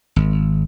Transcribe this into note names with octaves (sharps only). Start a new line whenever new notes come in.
G#1